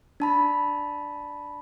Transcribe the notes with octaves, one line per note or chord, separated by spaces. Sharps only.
D4 A5 B5